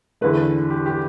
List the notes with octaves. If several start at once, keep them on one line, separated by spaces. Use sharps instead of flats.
E2 D3 A3 B4
G4
G4